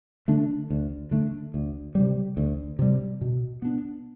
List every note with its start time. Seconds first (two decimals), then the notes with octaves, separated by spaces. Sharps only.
0.28 D3 A3 D4
0.70 D2
1.11 D3 A3 D4
1.54 D2
1.95 C3 G3
2.37 D2
2.79 C3 G3
3.21 B2
3.62 B3 D4